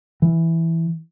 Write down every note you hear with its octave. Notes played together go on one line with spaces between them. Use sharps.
E3